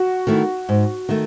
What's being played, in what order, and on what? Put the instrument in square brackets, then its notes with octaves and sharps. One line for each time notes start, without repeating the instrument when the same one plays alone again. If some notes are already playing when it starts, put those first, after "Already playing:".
Already playing: [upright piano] F#4
[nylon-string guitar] D#3 A3 E4
G#2
D#3 A3